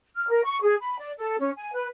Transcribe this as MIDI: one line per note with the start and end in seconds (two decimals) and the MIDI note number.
0.15 0.27 89
0.28 0.41 70
0.44 0.58 85
0.62 0.74 68
0.80 0.97 83
0.98 1.11 74
1.17 1.38 69
1.38 1.50 61
1.57 1.73 80
1.73 1.85 71